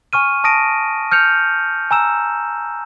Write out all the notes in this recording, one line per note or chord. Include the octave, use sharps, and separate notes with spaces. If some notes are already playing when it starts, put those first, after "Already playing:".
G#5 C#6 F6 D#7
A5 D#6 A#6 D7 D#7
F6 G6 C#7 F7
G#5 A#5 E6 E7